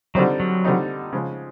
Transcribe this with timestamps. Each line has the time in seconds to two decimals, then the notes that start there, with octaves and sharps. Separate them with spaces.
0.15 D3 F#3 G3 C4 D#4
0.40 F#3
0.64 D3 G3 C4 D#4
1.12 C#3 F3 G#3